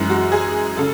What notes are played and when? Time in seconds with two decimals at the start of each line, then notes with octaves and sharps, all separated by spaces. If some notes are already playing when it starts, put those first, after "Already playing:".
Already playing: F#2 E3 G#3
0.10 F#4
0.32 G#4
0.77 C#3 A4